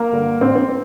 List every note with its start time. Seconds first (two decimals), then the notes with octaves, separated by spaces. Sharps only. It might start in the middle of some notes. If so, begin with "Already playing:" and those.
Already playing: A#3 A#4
0.12 G2 D3
0.41 A1 C4
0.55 C4